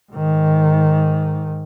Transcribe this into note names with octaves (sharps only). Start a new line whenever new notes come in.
G#2 D#3